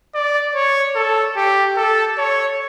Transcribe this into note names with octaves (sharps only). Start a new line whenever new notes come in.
D5
C#5
A4
G4
A4
C#5